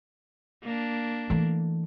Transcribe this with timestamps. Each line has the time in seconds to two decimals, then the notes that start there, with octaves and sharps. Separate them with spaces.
0.63 A#3 D4
1.30 E3 A3